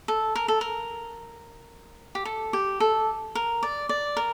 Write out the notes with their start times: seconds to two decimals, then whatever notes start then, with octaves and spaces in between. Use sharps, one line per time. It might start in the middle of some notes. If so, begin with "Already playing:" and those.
0.08 A4
0.36 A#4
0.48 A4
0.61 A#4
2.15 G4
2.25 A4
2.53 G4
2.80 A4
3.35 A#4
3.63 D5
3.89 D5
4.17 A#4